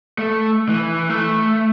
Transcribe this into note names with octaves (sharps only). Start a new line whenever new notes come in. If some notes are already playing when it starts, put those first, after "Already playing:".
A3
E3
A3